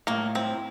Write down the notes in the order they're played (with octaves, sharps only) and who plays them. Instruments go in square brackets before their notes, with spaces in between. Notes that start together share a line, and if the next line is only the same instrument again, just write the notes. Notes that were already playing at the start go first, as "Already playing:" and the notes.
[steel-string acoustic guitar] A2 [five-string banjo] A#3
[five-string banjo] C4 [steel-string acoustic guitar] E4